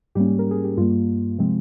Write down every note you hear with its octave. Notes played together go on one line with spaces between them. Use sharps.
G#2 G3 A#3 C#4 G4
A#4
G#4
G4
G2 G3 A#3 F4
C3 F3 G#3 C4